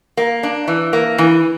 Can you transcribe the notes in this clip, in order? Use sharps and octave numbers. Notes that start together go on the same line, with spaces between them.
A#3
D4
E3
A#3
E3